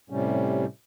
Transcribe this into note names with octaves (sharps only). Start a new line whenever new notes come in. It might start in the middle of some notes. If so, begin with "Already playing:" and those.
A2 C3 G3 C#4